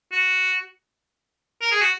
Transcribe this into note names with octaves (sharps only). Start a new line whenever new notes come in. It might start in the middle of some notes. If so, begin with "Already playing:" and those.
F#4
A#4
G#4
F#4